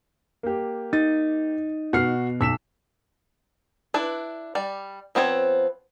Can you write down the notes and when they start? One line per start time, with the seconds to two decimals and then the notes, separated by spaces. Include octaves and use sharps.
0.43 A#3 G4
0.93 D#4 A6
1.93 B2 F#4 F6 C7
2.41 B1 E6 B6 E7
3.94 D4 E4 B4
4.55 G3 D5
5.15 F3 B3 C4 F#4 C#5